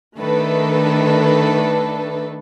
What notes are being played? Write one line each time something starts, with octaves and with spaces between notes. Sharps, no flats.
D#3 A3 D4 A4 B4